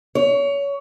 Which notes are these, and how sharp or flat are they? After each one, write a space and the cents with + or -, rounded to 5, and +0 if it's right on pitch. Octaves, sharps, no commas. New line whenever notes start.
C#5 +25